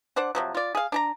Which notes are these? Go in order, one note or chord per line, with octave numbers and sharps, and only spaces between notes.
D4 C5 D5 F#5
C3 F3 F#3
F4 D5
G#4 F5
D4 A5 A#5